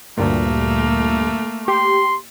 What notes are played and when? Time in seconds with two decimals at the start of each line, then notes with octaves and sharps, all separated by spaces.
0.18 D2 G2 A#2 A3 A#3
1.68 G4 C6